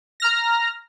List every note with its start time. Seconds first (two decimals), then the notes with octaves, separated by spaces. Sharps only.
0.20 A#5 F6 A#6